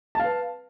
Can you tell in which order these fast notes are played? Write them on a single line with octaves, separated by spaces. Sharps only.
A5 F5 B4